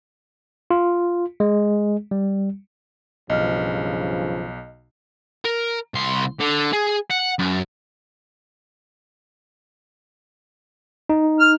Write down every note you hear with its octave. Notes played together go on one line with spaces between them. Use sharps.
F4
G#3
G3
B1 G2 C#3 F3 D#5 F6
A#4
C2 C6
D3
G#4
F#5
F#2
D#4
F6